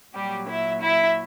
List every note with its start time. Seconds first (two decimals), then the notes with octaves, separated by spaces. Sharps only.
0.14 A#2 F#3 G3 G4
0.48 E4 E5
0.82 E4 E5